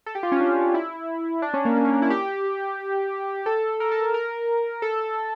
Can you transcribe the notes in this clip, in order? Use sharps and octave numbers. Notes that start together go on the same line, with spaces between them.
A4
G4
F4
C#4
D4
E4
D4
C#4
A#3
A#3
C#4
D4
E4
G4
A4
A#4
A4
A4
A#4
A4